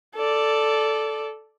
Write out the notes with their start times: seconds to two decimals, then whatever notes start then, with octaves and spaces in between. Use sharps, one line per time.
0.15 A4 D5